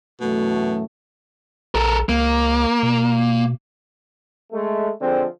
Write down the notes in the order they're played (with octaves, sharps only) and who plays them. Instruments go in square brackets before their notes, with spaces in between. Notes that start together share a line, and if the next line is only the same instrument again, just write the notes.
[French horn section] F#2 E3 A3 [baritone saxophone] B2
[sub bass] A#1 [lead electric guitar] A4 A#4
[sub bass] C#2 [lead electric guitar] A#3
[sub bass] B2
[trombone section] G#3 A3
D3 F3 G#3 C4